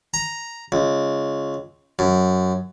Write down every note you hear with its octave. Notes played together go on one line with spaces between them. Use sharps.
A#5
C#2
F#2